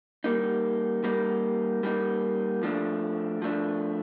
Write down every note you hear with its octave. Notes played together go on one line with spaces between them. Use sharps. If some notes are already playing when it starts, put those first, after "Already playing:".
G3 A#3 D#4
G3 A#3 D#4
G3 A#3 D#4
F3 A3 D4
F3 A3 D4